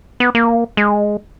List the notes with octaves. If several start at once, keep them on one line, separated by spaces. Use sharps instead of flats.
B3
A#3
G#3